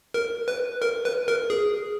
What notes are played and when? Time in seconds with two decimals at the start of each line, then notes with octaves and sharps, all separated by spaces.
0.14 A#4
0.48 B4
0.82 A#4
1.05 B4
1.28 A#4
1.50 G#4